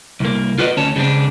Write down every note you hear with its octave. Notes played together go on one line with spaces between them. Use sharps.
C2 A#3
F4 F#4 B4 D5 D#5
D2 C#4 C#5 A5
C#3 G3 G#3 C4 D4